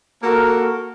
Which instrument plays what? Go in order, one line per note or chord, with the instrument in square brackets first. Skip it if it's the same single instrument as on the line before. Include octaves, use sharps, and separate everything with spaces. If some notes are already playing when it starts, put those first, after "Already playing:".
[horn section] A#3 F#4 A4 A#4